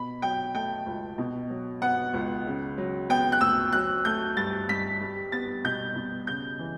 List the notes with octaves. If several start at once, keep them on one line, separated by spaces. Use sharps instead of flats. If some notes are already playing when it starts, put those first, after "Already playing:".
Already playing: B2 B5
F#3 G5
A3 G5
C#2
B2
F#3
B3 F#5
C#2
C#3
F#3
B3 G5
F#6
D2 E6
F#3 F#6
A3 G6
G2 A6
G2 B6
G3
B3 A6
B2 G6
B2
C#3 G6
E3